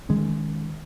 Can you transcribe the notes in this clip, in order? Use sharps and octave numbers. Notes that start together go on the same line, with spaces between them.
D#3 G#3 C#4